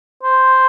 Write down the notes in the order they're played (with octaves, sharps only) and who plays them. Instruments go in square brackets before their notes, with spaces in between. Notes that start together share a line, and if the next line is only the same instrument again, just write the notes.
[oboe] C5